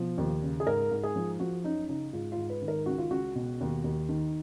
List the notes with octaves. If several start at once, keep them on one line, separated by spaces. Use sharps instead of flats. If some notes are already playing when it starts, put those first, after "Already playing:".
Already playing: B2 F3
D#2
C#3
G#4
G#2 A#4
G#2
G#4
F3
F3 F#4
F#2 D#4
C#3 D#4
G#2 F4
F4
G#2
B4
D#3
A#4
C#2 F#4
F4
C#2 F#4
B2
D#2
D#2
D#3